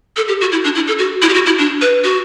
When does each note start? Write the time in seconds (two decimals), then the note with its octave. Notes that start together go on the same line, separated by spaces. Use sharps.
0.17 A4
0.28 G4
0.41 F#4
0.52 E4
0.64 D4
0.75 E4
0.87 A4
0.99 F#4
1.22 E4
1.29 G4
1.34 F#4
1.46 E4
1.58 D4
1.81 B4
2.04 F#4